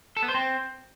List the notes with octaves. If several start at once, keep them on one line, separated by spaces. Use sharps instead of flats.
A4
B3
C5
C4